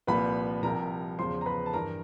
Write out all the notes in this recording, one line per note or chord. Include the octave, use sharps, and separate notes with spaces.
C2 A#2 F3 B4 B5
C2 C3 F3 A#4 A#5
E2 C#3 F3 C5 C6
A#5
B4 B5
A5
G2 E3 A#4 A#5